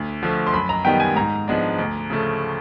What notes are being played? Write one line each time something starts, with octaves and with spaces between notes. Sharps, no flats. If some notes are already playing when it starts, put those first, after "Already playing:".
Already playing: D2
D3 F3 A3
C6
F#2 B5
A#5
D#3 G3 B3 G5
G#5
G#2 A#5
F3 G#3 B3 D4
D2
C#3 F3 A3